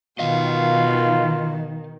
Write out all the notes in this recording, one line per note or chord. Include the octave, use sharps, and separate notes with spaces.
B2 D#3 F4 D#5 F5